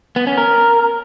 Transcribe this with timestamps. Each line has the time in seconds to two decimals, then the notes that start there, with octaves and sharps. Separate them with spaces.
0.16 B3
0.27 C#4
0.38 A#4